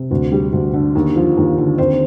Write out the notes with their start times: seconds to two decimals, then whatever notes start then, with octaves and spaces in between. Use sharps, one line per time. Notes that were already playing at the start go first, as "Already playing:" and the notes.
Already playing: C3
0.11 D2
0.32 G3
0.53 D2
0.73 D3
0.95 D#2
1.16 F3
1.37 D#2
1.58 D3
1.78 D#2 C4 C5